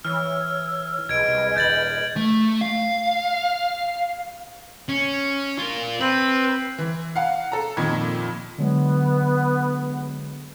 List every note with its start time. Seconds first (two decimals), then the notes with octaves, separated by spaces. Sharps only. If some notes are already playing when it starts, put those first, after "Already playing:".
0.05 E3 C#5 E6 F6
1.09 B1 G#4 B4 D#5 G#6 D7
1.28 C2
1.56 D#1 G6 A6 F#7
2.17 A3
2.61 F5
4.89 C#4
5.58 F4 A#4
6.00 C4 B4
6.78 E3
7.16 F5 F#5
7.52 A4 A#5
7.77 F2 A#2 D#3 B5 G#6
8.58 D3 F#3 G#3 B3